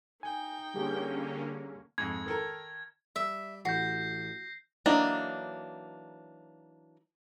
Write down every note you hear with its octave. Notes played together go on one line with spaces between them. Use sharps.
D#4 G5 G#5
D3 G3 A#3 C#4 G4 G#4
F2 G#2 G#6
D#3 A4 A#4
G3 E5
A1 F#4 G6 A#6 C7
E3 F#3 A#3 D4 D#4